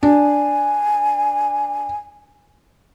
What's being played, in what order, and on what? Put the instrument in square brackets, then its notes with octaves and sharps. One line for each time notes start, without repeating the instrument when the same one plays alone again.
[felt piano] D4 [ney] G#5